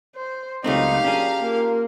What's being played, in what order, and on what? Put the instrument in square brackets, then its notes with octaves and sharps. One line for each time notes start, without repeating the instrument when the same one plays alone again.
[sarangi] C5
[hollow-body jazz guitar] C#2 A3 C4 [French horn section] A#2 F#3 [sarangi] D#4 [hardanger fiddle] G4 F5
[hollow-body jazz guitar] C#4 D4 G#4 [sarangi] A#5
[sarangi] A#3 [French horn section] F4 A#4